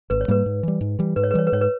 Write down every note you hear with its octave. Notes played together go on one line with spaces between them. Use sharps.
G#1 B4
C#5
G#2 G3 A#3 B4
G#2
E3 G3
G#2
E3 G3
G#2 B4
C#5
B4
E3 G3 C#5
B4
G#2 C#5
B4